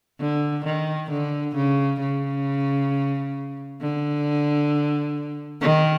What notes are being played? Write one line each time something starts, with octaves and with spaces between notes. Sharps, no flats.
D3
D#3
D3
C#3
C#3
D3
D#3